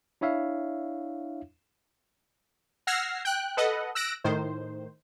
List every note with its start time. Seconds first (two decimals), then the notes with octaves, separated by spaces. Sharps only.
0.21 D4 E4 C#5 E5 F5
2.87 F#5 E6 F6 G#6 A#6 C7
3.25 G5 F#6
3.57 A4 B4 D#5 F#5
3.95 E6 F#6 A#6 D7
4.24 A2 D#3 C5